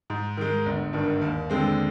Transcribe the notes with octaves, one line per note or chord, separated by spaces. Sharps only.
G#2
D#3 G#3
G1
G2 D#3
D#2
D3 G#3 C4